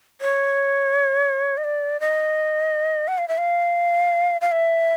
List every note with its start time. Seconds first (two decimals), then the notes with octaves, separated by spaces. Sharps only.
0.21 C#5
1.57 D#5
1.64 D5
2.00 D#5
3.08 F#5
3.18 F5
3.28 E5
3.38 F5
4.41 F5
4.52 E5